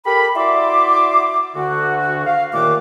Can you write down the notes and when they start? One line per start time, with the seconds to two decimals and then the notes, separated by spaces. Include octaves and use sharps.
0.06 G4 A4 A#4 B5
0.36 E4 F#4 D5 E5 C6 D6
1.56 D2 D3 F#4
2.26 F5
2.53 D#2 A#2 D#3 A3 F#5 D6